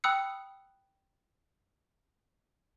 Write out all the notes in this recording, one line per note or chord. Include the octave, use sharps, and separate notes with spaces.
G5 B5 D#6 E6 F#6 C#7